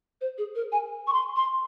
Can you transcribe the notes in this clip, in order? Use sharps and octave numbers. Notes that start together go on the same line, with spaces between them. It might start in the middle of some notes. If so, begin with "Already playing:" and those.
C5
G#4
A#4
G#5
C#6
C6
C6